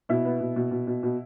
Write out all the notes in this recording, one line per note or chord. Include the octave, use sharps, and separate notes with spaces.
B2 E4
B3
B2
B2
B2
B2
B2